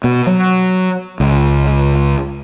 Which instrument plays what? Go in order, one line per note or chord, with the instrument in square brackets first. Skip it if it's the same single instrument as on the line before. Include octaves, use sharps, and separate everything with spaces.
[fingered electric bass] B2
F#3
C#2